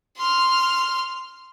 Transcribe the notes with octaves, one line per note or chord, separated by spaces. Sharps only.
C6 F6